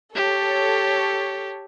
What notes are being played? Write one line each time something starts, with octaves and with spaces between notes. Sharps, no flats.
G4 A4 C#5